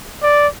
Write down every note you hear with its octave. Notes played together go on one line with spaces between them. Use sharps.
D5